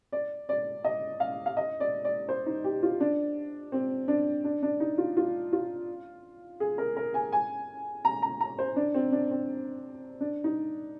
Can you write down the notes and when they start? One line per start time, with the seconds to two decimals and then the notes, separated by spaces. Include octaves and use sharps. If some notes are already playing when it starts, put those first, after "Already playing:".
0.12 D5
0.49 D5
0.85 D#5
1.20 F5
1.46 F5
1.57 D#5
1.80 D5
2.04 D5
2.29 C5
2.46 D#4
2.64 G4
2.83 F4
3.00 D4
3.72 C4
4.08 D4
4.44 D4
4.63 D4
4.80 D#4
4.98 F4
5.17 F4
5.53 F4
6.60 G#4
6.78 A#4
6.97 A#4
7.14 G#5
7.32 G#5
8.05 A#5
8.22 A#5
8.41 A#5
8.59 C5
8.76 D4
8.94 C4
9.12 D4
9.31 C4
10.21 D4
10.44 D#4